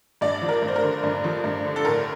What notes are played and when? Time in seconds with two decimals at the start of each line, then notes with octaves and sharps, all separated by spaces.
0.21 G2 D5
0.41 F3
0.49 A#4
0.62 G2
0.68 C5
0.76 A#4
0.83 D3
1.03 G2
1.24 F3
1.44 G2
1.65 D3
1.76 A4
1.84 A2 A#4